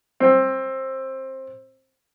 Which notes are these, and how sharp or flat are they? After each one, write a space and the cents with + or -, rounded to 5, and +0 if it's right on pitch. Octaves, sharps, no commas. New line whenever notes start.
C4 +20